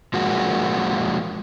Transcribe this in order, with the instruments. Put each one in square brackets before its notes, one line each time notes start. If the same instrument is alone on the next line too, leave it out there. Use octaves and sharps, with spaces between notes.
[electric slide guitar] F3 G#3 A#3 F#4